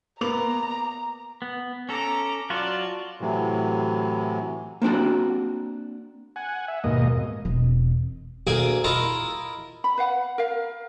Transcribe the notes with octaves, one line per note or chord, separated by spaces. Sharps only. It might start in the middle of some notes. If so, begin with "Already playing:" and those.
A#3 B3 A#5 D6 F7
B3
C#4 A4 A#5 D6
F#3 F4 F#4 D5 A5
A2 C3 E3 F#3
A#3 C4 D4 F#4
F#5 G#5
E5
D#2 G#2 B2 A#3 D#5
E1 C4
D2 A#3 G#4 G#5 D6
E4 F4 A#4 D#5 F5 A5
B5
B4 F5 F#5
A#4 F5